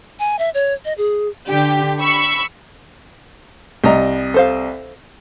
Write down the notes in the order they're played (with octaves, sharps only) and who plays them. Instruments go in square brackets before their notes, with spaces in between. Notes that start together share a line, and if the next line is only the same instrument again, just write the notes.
[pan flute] G#5
E5
C#5
D#5
G#4
[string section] D3 G4
B5 C#6 E6
[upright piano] C2 D#5 [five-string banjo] G3 A#5
[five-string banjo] A4 C5 F5